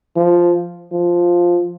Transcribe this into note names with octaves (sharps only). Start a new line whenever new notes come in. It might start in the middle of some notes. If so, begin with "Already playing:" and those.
F3
F3